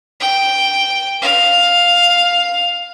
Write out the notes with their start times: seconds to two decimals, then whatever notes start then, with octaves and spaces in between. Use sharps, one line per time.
0.20 G5
1.22 F5